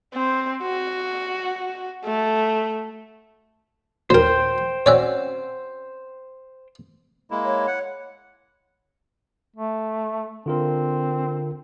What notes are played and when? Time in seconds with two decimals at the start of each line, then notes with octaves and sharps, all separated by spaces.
0.14 C4
0.63 F#4
2.05 A3
4.10 D#2 A#2 F#3 A#4 C5 G5
4.86 C4 C#4 F#4 C#5 D5 E5
7.31 G#3 A#3 E4
7.45 C#5
7.67 F#5
9.56 A3
10.46 D3 C4 F4 A#4